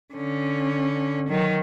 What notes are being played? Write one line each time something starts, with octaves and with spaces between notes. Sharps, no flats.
D3 C#4
D#3 F#3